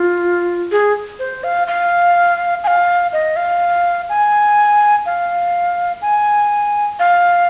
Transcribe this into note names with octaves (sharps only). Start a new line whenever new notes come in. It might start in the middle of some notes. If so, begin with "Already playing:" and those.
Already playing: F4
G#4
C5
F5
F5
G#5
F5
D#5
F5
G#5
F5
G#5
F5